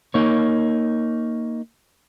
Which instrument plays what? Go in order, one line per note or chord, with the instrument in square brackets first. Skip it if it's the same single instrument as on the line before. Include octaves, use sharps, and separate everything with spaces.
[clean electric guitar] A#3 D#4 C#5